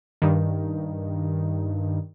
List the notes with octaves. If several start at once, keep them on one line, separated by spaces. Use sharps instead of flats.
G2 D#3